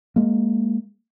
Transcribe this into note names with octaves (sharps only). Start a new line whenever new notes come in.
G#3 A#3